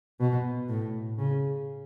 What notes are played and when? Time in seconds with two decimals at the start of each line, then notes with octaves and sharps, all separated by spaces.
0.20 B2
0.69 A2
1.18 C#3